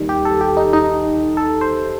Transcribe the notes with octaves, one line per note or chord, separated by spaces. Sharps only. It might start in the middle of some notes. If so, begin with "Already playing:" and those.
Already playing: D#2 D#3 G3
G4
A4
G4
D#4
D#4
A4
C5